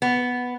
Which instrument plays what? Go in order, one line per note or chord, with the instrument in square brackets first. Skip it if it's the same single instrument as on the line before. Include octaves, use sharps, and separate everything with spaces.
[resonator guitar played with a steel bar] B3